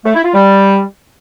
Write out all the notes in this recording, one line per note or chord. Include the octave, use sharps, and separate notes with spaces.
A3
E4
F4
G3